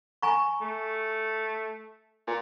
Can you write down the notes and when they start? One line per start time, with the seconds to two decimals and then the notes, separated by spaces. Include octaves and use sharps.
0.22 G#5 A#5 C#6
0.61 A3
2.27 A#2